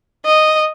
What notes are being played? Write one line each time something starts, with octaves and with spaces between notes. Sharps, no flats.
D#5